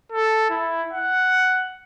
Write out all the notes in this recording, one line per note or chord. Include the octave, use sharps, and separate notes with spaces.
A4
E4
F#5